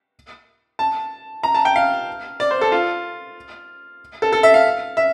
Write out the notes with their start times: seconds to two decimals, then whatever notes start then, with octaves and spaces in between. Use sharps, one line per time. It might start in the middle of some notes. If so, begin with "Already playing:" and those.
0.79 A5
1.43 A#5
1.54 A5
1.65 G5
1.76 F5
2.40 D5
2.51 C5
2.61 A4
2.72 F4
4.22 A4
4.33 A4
4.43 E5
4.54 F5
4.97 E5